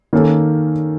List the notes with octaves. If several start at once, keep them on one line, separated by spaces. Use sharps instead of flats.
D#3 A#3 C#4 A4